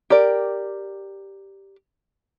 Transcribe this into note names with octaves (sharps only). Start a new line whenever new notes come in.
G4 A#4 D5